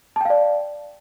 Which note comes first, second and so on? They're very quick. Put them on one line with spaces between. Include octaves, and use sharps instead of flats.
A5 G5 F5 D5